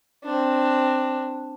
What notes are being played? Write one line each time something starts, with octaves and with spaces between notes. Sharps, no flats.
C4 D4